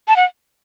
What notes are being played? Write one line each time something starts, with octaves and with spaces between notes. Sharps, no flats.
A5
F#5